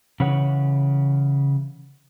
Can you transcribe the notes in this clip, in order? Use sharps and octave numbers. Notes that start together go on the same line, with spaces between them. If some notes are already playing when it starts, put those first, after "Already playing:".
C#3 E3 C#5 F#5